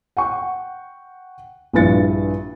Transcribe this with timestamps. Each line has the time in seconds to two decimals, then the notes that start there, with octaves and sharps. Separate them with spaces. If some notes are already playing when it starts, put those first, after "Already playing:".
0.17 F#5 G5 C#6
1.73 A#1 G2 E4 B4 A6 C#7